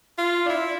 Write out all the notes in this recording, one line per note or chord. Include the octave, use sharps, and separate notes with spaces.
F4
D4
E4